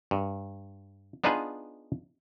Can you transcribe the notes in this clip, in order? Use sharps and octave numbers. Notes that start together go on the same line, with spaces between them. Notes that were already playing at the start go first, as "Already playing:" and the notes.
G2
B3 D4 D#4 F4 G#4 B4